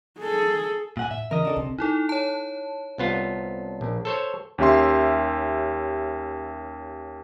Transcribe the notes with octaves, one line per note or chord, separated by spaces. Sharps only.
G#4 A4
A#2 F#5 G#5
A2 E5
E2 C#3 A#4 D#5
D4 F#4 A4
B1 C3
D#4 E4 A4
C#5 A5
C2 B3 F4
A#1
A4 C5 C#5
D#2 C#4 G4 E5 C6